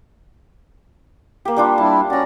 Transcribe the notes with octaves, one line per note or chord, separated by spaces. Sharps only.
A#3 G4
G3 D4 F4
G3 D4 E4 A5
C#4 F#4 D5 A#5